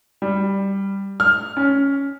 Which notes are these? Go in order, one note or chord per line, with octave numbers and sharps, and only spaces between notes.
G3
F6
C#4